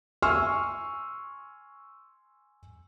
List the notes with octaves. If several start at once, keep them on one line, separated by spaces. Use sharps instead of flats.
G#5 C6 C#6 E6 F6